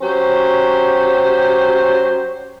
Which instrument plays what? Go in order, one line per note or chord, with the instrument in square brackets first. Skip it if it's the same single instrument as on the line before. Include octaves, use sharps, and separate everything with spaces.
[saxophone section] F#3 C#4 G4 C5